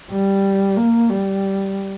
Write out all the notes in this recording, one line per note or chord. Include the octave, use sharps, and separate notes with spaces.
G3
A#3
G3